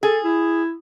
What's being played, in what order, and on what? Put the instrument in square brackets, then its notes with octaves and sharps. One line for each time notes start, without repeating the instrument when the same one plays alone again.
[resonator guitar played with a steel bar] G#4 [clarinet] A4
[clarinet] E4